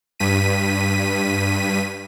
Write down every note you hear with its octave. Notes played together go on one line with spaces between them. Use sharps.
G2 B6 D#7